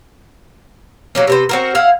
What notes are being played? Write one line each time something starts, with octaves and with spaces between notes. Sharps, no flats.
F#3 A#3 C#4
C3 B3 C5
C4 F#4 A#4
E4 F5 F#5